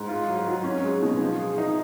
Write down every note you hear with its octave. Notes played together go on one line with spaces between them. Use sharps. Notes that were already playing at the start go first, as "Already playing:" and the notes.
Already playing: G#2
F4
F#3
F#3
C#4
G#3
B2
F3
G#4
D#4